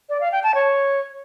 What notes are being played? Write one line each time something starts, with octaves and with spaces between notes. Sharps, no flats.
D5
F5
G5
A5
C#5